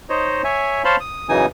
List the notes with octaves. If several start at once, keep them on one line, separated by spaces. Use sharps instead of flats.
D#4 C5 C#5 D#5
C#5 E5 G#5
C5 C#5 F5 A5 B5 C6
D#6
F#2 C#3 E3 D#4 G#5 D#6